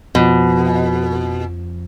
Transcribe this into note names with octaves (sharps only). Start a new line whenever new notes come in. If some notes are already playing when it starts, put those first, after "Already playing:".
F2 B2 F3